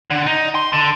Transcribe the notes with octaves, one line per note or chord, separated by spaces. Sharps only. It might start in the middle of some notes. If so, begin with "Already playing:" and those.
D3
D#4
C6
D3